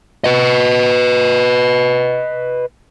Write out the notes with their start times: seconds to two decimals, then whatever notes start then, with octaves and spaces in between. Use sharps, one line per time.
0.24 B4 D#5